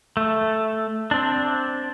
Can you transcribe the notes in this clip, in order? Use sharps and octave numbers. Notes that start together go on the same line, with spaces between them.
A3
C4 D4